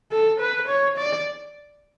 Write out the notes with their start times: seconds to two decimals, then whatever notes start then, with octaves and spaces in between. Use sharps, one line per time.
0.12 A4
0.40 B4
0.68 C#5
0.97 D5